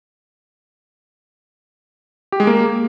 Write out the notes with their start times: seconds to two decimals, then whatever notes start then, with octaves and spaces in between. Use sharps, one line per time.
2.32 G4
2.40 G#3
2.47 A#3